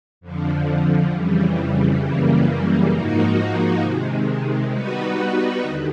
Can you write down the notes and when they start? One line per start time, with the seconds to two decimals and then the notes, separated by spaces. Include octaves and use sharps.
0.21 F2 D3 F3
1.11 F2 C#3 E3 G3
2.01 F#2 C#3 E3 G3 A#3
2.91 G#2 F3 A#3 D#4 F#4
3.81 C3 D#3 G#3
4.72 G3 B3 D#4 F#4 B4
5.62 D#2 D3